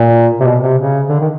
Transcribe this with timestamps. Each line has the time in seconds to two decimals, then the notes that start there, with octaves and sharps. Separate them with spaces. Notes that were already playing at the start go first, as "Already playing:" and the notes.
Already playing: A#2
0.40 C3
0.47 B2
0.63 C3
0.79 C#3
1.09 D3
1.20 D#3